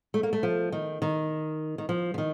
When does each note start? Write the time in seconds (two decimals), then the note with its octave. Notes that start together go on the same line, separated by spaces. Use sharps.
0.14 A3
0.23 A#3
0.33 A3
0.43 F3
0.72 D#3
1.02 D#3
1.78 D#3
1.89 F3
2.14 F3
2.18 D#3